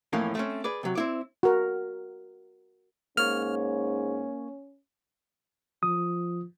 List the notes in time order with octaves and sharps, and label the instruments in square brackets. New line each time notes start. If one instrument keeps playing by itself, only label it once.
[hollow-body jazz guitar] F2 A2 E3 A#3 C#4
A3 C4 C#4
G#4 B4 D5
C3 F#3
C4 E4 D5
[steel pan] F#4 A#4
[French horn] G#2 [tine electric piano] A#3 C#5 [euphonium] C#4 [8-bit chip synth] F6
[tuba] F3 [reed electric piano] D#6